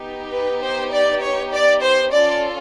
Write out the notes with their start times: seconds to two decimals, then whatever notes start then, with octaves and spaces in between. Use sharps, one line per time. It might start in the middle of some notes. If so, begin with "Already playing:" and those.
Already playing: B3 D#4 G4
0.31 B4
0.61 C5
0.92 D5
1.22 C#5
1.52 D5
1.83 C5
2.12 C#4 F4 A4 D5